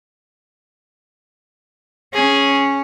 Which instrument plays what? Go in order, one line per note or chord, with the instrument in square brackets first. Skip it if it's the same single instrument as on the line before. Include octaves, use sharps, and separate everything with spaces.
[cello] C#4 [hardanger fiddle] G#4